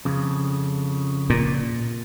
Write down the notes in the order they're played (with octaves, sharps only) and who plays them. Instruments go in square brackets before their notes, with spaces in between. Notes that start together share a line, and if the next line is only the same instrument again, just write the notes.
[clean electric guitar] F2 C#3
[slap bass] A#2